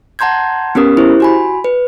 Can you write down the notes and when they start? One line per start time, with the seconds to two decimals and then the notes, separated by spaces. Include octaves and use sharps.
0.19 F#5 A5 A#5 C6 G6 G#6
0.75 B3 C#4 G4 A#4 D#6
0.97 E4 G4 C5
1.20 F#4 G#5 B5
1.64 B4